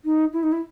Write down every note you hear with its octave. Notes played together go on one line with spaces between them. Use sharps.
D#4
E4
D#4
E4